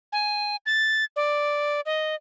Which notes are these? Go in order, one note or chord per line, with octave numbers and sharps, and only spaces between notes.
G#5
A6
D5
D#5